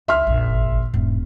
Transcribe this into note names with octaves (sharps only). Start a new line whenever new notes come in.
C#2 E5 C6 F6
F1 A#1
G#1
E1 G#2